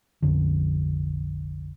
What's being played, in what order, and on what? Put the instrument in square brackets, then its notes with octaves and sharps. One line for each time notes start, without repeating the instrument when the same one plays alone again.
[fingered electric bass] F1 A#1 F2 D3